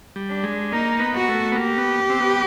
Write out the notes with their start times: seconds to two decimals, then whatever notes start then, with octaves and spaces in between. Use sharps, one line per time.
0.16 G3
0.29 D4
0.44 G#3
0.72 A#3 D#4
1.00 B3
1.14 F#4
1.28 A3
1.52 B3
1.56 A#3 G4
1.78 B3
2.10 C4
2.20 B3